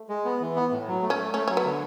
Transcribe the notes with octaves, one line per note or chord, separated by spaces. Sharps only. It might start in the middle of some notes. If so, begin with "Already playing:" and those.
Already playing: A3
G#3
B3
E3
B3
A2
F#3
A3
C#4
A3
A3 C#4
F#3 C#4
B3
D3